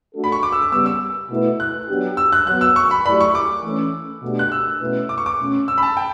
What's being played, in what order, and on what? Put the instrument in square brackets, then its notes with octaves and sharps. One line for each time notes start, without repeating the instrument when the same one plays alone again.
[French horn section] A3 D4 F#4 A4
[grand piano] B5
C#6
D6
E6
D6
[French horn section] C#3 G3 B3 [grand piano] E6
[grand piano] E6
[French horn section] B2 A3 E4 B4
[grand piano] F#6
[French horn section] F#3 B3 D4 G4
[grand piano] E6
F#6
[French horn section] F#3 B3 F#4 [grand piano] F#6
[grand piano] E6
C#6
B5
[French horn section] F#3 A3 E4 G4 D5 [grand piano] B5
[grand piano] C#6
D6
[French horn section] E3 A3 C#4
B2 A3 D4 G4
[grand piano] F#6
E6
[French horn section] B2 A3 C#4 E4 B4
[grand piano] D6
C#6
D6
[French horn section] B2 A3 C#4
[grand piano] E6
B5
A5
G5